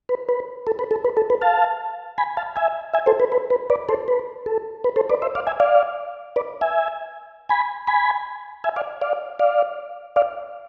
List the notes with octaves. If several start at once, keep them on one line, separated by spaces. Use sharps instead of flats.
B4
B4
A4
B4
A4
B4
A4
B4
F5 A5
G#5 B5
F5 A5
E5 G#5
E5 G#5
A4 C5
B4
B4
B4
B4 D5
A4 C5
B4
A4
B4
A4 C5
B4 D5
C5 E5
D5 F5
E5 G#5
D5 F5
B4 D5
E5 G#5
G#5 B5
G#5 B5
E5 G#5
D5 F5
D5 F5
D5 F5
D5 F5